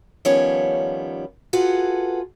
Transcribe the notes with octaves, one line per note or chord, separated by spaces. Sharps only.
D#3 F3 G3 B3 C#4 C#5
F4 F#4 G#4 A4 B4 F#5